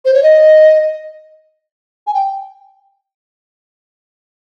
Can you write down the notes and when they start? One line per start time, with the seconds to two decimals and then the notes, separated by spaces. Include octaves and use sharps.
0.05 C5
0.14 C#5
0.23 D#5
2.07 G#5
2.14 G5